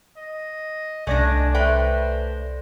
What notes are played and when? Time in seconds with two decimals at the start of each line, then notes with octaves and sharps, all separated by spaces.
0.17 D#5
1.07 C2 A3 D4 D5 G#5 A#6
1.54 A3 B4 C5 G5